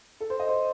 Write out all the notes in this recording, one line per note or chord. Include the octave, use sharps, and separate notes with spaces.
A4
C5
D#5
C5